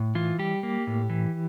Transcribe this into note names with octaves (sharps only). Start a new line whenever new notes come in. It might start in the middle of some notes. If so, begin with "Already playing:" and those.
Already playing: A2
E3 F4
G3 G4
A#3
A2
E3